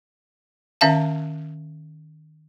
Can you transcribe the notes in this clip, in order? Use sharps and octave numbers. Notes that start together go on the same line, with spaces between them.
D#3 C#4 E5 F5 A5